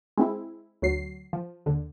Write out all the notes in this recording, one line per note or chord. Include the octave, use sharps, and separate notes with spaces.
G#3 C4 E4
D2 F#3 C7
F3
D#2 D3